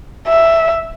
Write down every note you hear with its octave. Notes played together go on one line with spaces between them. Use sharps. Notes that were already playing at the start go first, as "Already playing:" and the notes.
E5